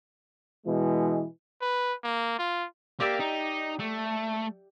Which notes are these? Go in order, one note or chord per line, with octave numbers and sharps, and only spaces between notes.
B2 E3 G#3
B4
A#3
F4
A#3 G4 D5 E5
D#4
A3